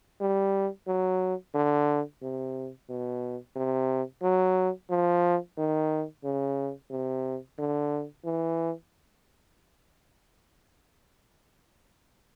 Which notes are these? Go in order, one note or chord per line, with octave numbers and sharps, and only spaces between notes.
G3
F#3
D3
C3
B2
C3
F#3
F3
D#3
C#3
C3
D3
E3